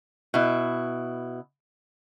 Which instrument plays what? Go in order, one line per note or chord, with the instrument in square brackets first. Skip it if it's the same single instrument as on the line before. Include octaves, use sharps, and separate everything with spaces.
[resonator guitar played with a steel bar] B2 E4